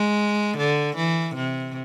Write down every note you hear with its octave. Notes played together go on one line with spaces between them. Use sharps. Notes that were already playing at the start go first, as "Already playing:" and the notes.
Already playing: G#3
D3
E3
C3